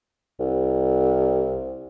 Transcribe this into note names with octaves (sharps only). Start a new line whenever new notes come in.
C2